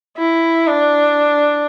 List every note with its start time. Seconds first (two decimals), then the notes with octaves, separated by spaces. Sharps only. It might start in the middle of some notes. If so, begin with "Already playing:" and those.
0.18 E4
0.68 D4